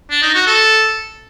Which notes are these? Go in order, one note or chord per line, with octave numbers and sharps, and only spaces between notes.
D4
D#4
F#4
A4